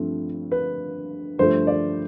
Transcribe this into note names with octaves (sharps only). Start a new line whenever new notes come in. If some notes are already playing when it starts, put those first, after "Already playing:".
Already playing: G2 F3 A3 C4
B4
G2 F3 A3 C5
D5